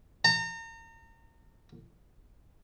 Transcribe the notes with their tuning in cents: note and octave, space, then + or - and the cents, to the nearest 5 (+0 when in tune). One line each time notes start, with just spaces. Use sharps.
A#5 -35